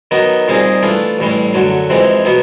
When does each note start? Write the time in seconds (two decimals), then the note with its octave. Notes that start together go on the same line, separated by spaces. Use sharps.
0.11 D#3 F#3 B3 D#4
0.48 A#2 G3 C4 D#4 G#4
0.83 E3 A3 D4 F4
1.18 A1 A2 E3 G3
1.54 F#2 D3 F#3
1.90 F2 C3 E3 G#3
2.25 B2 F#3 B3